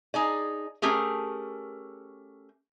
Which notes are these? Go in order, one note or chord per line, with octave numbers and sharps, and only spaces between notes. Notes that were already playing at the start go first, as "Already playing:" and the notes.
D#4 G#4 D5
A3 C#4 G4 G#4 A#4